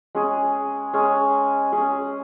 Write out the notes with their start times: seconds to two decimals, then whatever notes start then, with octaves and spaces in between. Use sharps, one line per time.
0.15 G#3 C#4 G#4
0.93 G#3 C#4 G#4
1.72 G#3 C#4 G#4